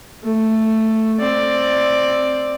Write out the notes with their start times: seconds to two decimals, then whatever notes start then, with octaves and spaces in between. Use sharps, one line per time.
0.24 A3
1.19 C4 D5